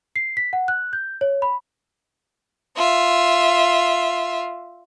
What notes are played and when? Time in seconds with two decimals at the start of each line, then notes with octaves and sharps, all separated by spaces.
0.16 C7
0.37 B6
0.53 F#5
0.68 F#6
0.93 G6
1.21 C#5
1.42 B5
2.76 F4 E5